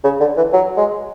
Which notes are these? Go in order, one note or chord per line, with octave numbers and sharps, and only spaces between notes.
C#3
D3
E3
F#3
G#3